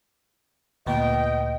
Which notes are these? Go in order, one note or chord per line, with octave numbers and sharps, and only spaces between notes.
D2 A#2 B3 D#5 G5